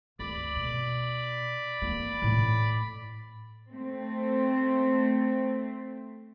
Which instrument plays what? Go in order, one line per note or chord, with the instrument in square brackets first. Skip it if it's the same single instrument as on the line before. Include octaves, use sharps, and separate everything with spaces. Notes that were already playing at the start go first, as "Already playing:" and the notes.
[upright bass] D2 [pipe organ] D5 B5
[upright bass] B2
A#3
A2
[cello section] A3 C4